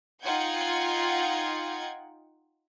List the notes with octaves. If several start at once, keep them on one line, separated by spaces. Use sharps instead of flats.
D#4 F4 F#5 G5 G6 G#6